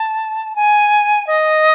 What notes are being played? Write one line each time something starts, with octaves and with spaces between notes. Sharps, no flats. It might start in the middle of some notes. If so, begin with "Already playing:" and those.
Already playing: A5
G#5
D#5